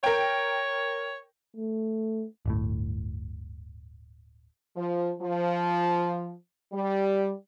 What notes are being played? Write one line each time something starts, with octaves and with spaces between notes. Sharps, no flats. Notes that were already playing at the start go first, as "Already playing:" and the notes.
A#4 C#5 G5
A3
D1 G1 A2
F3
F3
G3